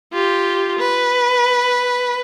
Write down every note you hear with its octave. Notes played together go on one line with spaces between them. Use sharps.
F4 G4
B4